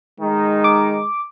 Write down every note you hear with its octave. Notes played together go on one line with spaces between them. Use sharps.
D#3 G#3 D#4
D6